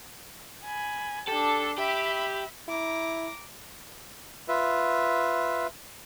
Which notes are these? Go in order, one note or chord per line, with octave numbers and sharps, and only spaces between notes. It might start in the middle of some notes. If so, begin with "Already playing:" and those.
G#5 B5
D4 G4 A4
G4 E5 B5
E4 A#5 D6
F4 B4 E5